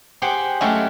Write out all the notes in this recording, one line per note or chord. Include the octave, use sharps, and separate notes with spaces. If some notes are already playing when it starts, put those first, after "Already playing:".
G4 G#4 C5 F#5 G5
F#3 G#3 A3 C#4 E4 G4